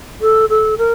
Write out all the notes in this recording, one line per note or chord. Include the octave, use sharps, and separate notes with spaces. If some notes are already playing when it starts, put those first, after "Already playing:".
A4
A4
A#4